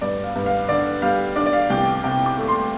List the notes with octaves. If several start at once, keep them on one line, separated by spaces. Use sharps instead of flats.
G2 D5
F5
G2
F5
D3 D5
G3 F5
D4 D5
D5
F5
C2 G5
C3 G5
D6
A3
C6